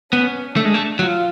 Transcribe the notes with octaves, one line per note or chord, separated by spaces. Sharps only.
B3 C#4
A3 D4
G#3
A3
F#3 F4